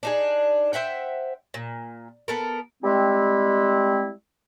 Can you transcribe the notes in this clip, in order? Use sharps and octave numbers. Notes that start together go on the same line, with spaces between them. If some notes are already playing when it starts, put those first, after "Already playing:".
D4 D#4 G#4
C5 E5 F#5 G5
A#2
B3 A4 A#4
G3 G#3 C4 E4